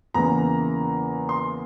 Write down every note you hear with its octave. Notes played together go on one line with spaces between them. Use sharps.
E2 C#3 E3 A#3 A#5
C6